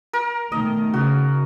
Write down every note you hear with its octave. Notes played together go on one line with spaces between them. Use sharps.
A#4
B2 D#3 A3 D#5
C#3 F#4